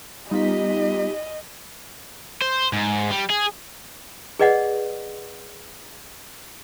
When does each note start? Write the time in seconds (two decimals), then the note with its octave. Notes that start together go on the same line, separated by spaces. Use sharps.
0.31 G3 B3 D#4 F4 G4 D#5 B6
2.42 C5
2.73 G#2
3.11 G3
3.30 G#4
4.39 G#4 B4 D5 D#5 F#5